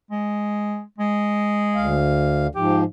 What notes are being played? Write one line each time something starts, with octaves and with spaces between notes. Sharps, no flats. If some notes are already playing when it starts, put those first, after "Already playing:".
G#3
G#3
D2 F5
G#2 F3 G4